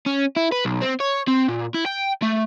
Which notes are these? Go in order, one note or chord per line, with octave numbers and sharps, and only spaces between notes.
C#4
E4
B4
B1
C4
C#5
C4
A#2
E4
G5
A3